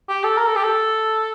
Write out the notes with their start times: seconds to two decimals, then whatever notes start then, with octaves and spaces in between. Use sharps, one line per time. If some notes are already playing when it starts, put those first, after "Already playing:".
0.09 G4
0.23 A4
0.38 A#4
0.47 A4
0.56 G4
0.63 A4